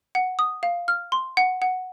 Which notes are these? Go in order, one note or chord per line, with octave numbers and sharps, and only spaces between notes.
F#5
D#6
F5
F6
C6
F#5
F#5